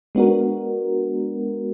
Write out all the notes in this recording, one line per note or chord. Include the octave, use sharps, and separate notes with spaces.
G#3 B3 D4 F#4 A#4